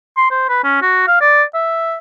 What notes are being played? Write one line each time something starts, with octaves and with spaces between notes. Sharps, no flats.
C6
C5
B4
C#4
F#4
F5
D5
E5